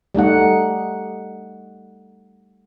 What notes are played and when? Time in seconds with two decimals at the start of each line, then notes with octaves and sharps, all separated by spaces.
0.15 G3 A3 D#4 F#5